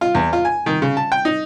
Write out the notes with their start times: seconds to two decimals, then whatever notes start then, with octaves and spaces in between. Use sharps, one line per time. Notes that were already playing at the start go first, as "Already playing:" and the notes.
0.01 F4
0.15 E2
0.33 F4
0.45 G#5
0.66 D#3
0.82 C#3
0.97 A5
1.12 G5
1.25 D#4